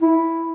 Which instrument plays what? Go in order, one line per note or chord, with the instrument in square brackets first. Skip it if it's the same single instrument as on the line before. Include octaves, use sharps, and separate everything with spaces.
[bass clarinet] E4